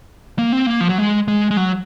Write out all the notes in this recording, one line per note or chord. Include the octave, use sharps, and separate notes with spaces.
A#3
C4
A#3
F3
F#3
G#3
G#3
G#3
F#3